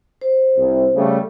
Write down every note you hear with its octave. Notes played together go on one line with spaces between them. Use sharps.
C5
C2
C#3 G3 A3